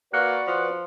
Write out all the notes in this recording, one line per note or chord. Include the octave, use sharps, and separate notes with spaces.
A#3 F#4 B4 D5 F#6 C#7
F3